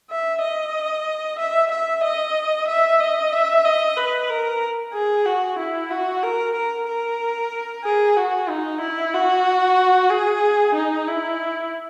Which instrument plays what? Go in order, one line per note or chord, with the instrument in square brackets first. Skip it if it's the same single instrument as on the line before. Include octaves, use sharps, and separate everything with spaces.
[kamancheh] E5
D#5
E5
E5
D#5
E5
D#5
E5
D#5
B4
A#4
G#4
F#4
E4
F#4
A#4
A#4
A#4
G#4
F#4
D#4
E4
F#4
G#4
D#4
E4